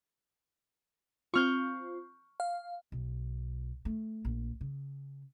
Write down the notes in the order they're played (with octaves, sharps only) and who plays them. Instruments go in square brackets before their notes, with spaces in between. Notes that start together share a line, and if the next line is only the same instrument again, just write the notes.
[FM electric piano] C4 F4 [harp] C#6 F6 G6
[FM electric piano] F5
[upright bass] B1
A3
A#1
C#3